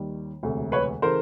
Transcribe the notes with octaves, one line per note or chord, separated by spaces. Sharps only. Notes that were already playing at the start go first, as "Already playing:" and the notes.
Already playing: D#2 D#3 G3
E1 D2 C3
B4 C#5
C#3 E3 A3 A#4 C5